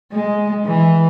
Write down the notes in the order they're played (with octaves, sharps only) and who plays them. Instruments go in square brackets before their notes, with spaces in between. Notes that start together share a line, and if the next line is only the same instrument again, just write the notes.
[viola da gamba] G#3
E3